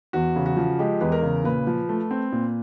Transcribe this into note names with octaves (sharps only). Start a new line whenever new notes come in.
E2 F#4
C#3
F#4
F3
G#3 G4
E2 B4
A#4
C#3
A#2 B4
F3
A3
C4
A#2